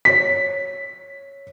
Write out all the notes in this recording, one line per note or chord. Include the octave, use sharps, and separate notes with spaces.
C#5 B6